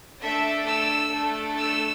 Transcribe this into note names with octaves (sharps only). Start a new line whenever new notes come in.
A3 D4 A4 E5
E6
A3 D4 A4
E6